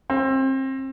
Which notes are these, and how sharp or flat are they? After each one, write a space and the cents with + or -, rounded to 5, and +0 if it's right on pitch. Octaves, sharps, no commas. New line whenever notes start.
C4 +30